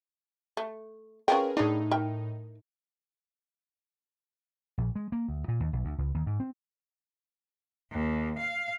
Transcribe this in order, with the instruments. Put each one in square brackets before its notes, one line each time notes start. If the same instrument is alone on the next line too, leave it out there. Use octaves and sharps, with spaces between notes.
[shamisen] A3
[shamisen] C#4 F4 G5 [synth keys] G#4 A#4 B4
[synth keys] A2 D#4 [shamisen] D4 G#4
[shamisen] A#4 E5 G5
[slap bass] A#1
G#3
A#3
D2
A#2
D#2
B1
D2
C#2
D#2
G#2
C4
[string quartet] D#2
F5